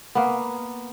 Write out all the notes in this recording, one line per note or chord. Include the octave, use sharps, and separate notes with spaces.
A#3 B3